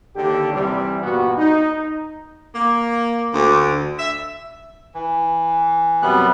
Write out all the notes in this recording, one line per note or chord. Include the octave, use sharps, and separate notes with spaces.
D#2 D3 G4
C3 E3 G3
G2 A#2 B3 F#4 G4
D#4
A#3
D2
E5
E3
F#2 C3 G3 B3 F#6